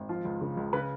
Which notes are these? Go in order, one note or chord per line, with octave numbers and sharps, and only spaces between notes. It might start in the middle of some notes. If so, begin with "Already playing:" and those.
Already playing: G#1
F3 F4
C#2
C#3
C#2
C#3 B4